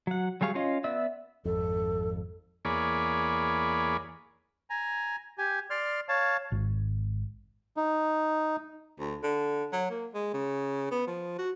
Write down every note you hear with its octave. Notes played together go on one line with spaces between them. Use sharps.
F#3 F#5
F#3 G3 G#4 F5 C#6
C#4 F4 C#5 D#5 F5
B3 D5 E5 E6
G#1 F2 A4
E2 A#3 G#4 C#5 D5 B5
G#5 A#5
G4 G#5
D5 C6 F6
C#5 F5 A5
G#1
D#4
D2
D3
F#3
A#3
G#3
C#3
B3
F3
F#4